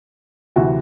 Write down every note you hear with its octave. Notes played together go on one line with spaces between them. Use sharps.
D2 C3 E3 F#4